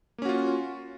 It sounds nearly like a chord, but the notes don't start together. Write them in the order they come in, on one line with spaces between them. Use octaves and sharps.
A#3 C#4 F#4 F4